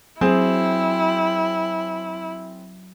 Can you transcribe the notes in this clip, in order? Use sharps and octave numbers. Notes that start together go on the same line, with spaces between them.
F#3 C4 E4 G#4